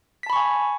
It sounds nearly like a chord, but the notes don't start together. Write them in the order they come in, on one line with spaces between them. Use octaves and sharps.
B6 A5 B5 C#6 G#5